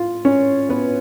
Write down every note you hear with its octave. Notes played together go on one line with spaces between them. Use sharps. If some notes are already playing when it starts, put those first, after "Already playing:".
Already playing: F4
C#4 C#5
B3 B4